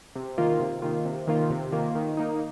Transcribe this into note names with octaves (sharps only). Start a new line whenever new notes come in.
C3
D#3 A#3 F4
C3
D#3 A#3 F4
C3
D#3 A#3 F4
C3
D#3 A#3 F4
D#3
A#3 D#4